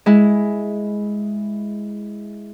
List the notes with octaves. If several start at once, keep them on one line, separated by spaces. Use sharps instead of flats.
G#3 E4